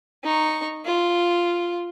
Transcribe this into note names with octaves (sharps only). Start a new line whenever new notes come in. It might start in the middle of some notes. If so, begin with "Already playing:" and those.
D#4 C#6
F4